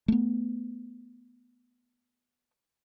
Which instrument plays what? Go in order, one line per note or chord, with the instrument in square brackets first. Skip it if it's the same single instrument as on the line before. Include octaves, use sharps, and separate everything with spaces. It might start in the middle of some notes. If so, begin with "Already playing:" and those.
[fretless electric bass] A3 B3